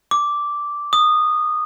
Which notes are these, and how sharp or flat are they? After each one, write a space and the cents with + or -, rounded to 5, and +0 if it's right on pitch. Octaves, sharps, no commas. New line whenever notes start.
D6 -5
D#6 -15